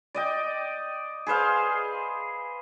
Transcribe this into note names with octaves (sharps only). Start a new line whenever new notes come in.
D5 D#5 G5
G#4 B4 C5 F5